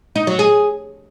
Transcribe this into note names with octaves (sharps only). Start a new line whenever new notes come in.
D#4
F#3
G#4